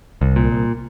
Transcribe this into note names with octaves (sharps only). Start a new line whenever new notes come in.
C2
A#2
C2